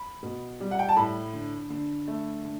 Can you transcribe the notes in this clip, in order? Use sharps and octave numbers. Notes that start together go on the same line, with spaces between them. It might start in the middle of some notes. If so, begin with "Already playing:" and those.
Already playing: B5
B2
G3
F#5
G5
A5
A2 B5
D3
D3
A3
D3